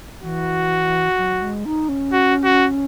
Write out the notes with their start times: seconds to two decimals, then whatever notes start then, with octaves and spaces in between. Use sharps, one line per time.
0.23 E3 F#4
1.18 F#3
1.42 G#3
1.66 D#4
1.89 C#4
2.12 F#4
2.44 F#4